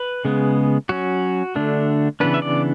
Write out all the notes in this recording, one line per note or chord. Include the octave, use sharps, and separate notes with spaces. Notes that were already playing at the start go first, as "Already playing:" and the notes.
Already playing: B4
C#3 G#3 B3
F#3 C#4 F#4
D3 A3 D4
C#3 E3 B3 D4 B4
E5
D5